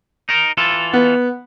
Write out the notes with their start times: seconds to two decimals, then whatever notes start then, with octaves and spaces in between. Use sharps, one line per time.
0.29 D#4 A#4
0.57 E3 F4 A4
0.93 B3